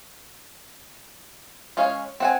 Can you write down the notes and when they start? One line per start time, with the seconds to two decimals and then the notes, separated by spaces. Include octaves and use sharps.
1.77 G#3 C#4 C#5 F5
2.20 C4 F#5 G#5